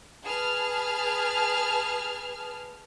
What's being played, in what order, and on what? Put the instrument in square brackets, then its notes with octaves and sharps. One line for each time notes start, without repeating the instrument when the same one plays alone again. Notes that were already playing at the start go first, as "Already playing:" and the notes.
[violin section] G#4 B4 A5 F6